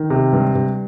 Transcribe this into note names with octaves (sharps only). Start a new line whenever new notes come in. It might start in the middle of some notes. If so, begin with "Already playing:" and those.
Already playing: D#3
C3
G2
G2